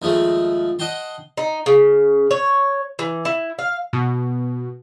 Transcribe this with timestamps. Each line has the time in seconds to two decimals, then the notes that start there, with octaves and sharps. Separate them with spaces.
0.02 D#2 F3 G#3 A3
0.79 D#5 F#5 G5 A5 C6
1.37 D#4
1.66 C#3
2.31 C#5
2.99 E3
3.25 E4
3.59 F5
3.93 B2